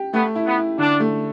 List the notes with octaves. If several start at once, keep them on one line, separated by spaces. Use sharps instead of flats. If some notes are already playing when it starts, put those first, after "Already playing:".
Already playing: G4
A3 B3
E4
B3
E4
D3 D4
A3